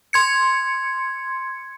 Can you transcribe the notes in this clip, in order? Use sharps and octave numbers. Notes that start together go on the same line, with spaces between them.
C6 G#6 C#7